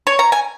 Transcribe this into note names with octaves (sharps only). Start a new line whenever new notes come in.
C#5
A#5
G#5